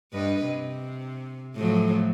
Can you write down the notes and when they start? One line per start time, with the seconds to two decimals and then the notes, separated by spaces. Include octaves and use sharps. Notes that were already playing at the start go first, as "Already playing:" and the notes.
0.13 G2 B4 D#5
0.46 C3
1.55 A2 F3 F#3